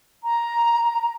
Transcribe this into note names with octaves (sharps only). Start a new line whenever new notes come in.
A#5